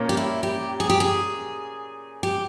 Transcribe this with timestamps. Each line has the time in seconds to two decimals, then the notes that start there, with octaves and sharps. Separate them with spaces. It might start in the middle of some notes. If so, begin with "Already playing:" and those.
Already playing: A#2 A#3 C#4
0.09 G4
0.17 E4
0.43 G4
0.80 G#4
0.90 G4
1.00 G#4
2.23 G4